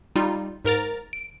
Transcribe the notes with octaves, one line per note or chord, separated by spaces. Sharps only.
G3 D#4 F4
G#2 A#4 A#5 A6
D7